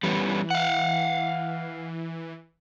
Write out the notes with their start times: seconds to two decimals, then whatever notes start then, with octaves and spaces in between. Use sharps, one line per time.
0.03 E3 G3 B3 C#4
0.50 F5 F#5